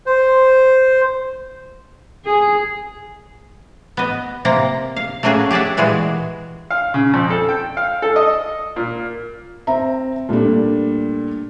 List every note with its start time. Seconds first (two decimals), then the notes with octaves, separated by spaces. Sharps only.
0.06 C5
2.25 G#4
3.97 B3 D#5
4.45 C3 A#3 A#5
4.96 F5
5.23 A3 A#3 C#4 F#4 G#4
5.51 G4 G#4 D5 E5 F#5
5.77 A#2 E3 G#3 F#4 G#4
6.70 F5
6.94 C#3
7.14 F2
7.30 A4
7.49 G5
7.77 F5
8.02 A4
8.16 D#5
8.76 A#2
9.67 C4 E5 A#5
10.29 A#2 G3 A3 D4